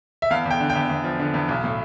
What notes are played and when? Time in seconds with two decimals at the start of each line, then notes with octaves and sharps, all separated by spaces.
0.22 E5
0.30 E2 F5
0.46 E2 G5
0.60 D3
0.70 G5
0.75 E2
0.89 E2
1.04 F3
1.20 D3
1.34 E2
1.49 B1
1.64 A2